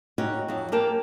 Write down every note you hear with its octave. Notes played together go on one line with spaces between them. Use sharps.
C#4 D#4 F#4 G4 C#5
F2 F#3
A#3 G4 A#4 A5